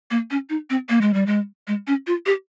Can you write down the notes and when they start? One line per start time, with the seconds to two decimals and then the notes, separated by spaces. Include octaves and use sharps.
0.11 A#3
0.31 C#4
0.50 D#4
0.70 C4
0.89 A#3
1.01 G#3
1.14 G3
1.26 G#3
1.67 G#3
1.87 C#4
2.07 F4
2.26 G4